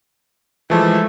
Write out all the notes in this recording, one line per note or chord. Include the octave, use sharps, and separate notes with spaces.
E3 F3 G#3 A3